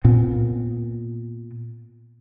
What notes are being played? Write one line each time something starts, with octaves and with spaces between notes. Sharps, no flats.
A#2 B3 C4